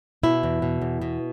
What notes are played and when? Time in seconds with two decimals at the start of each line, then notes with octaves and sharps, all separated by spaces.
0.23 B2 E4
0.43 E2
0.62 B2
0.81 E2
1.01 B2